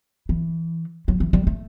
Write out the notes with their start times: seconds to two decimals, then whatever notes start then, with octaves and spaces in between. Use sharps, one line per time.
0.29 E3
1.08 F#3
1.20 E3
1.33 G3
1.47 A3